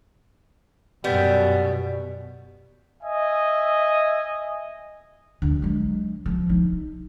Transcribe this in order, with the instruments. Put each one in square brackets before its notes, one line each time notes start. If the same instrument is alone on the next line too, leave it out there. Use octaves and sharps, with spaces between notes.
[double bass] F#2 B2 [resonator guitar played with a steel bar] G3 B3
[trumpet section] D#5 E5 G#5
[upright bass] D2
F#3 G#3
F3 C4
D#4